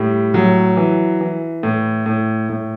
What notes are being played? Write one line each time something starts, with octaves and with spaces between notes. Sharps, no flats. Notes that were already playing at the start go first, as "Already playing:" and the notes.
Already playing: A2 G3
A2 F#3
E3
E3
A2
A2
A2